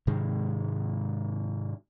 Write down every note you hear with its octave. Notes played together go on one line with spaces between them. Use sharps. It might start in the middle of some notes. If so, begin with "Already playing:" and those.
G#2 C3 D#3 G#3